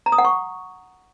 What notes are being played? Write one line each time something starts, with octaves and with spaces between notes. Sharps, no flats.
A#5
D#6
F#5
C#6